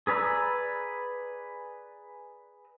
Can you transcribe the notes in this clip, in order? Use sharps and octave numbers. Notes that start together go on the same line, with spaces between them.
G#4 B4 D5 A#5 E6